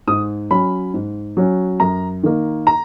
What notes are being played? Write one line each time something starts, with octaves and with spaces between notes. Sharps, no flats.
G#2 D#6
F#3 C#4 B5
G#2
F#3 C#4
F#2 A#5
D#3 A#3
A#5